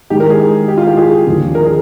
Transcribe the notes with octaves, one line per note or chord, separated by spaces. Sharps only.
D#3 G#3 D#4 G4
A#4
G#4
G4
F4
G4
G#4
D#2 D3 F3 A#3
A#4
G#4